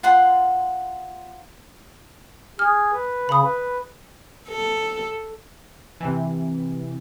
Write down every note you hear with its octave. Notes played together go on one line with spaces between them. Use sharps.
F4 F#5 C6
G#4 F6
B4
C#3 B5 D#6
B4
A4
C3 E3